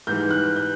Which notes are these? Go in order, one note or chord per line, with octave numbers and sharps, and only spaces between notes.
G#2 E3 G3 G6
F#6
G6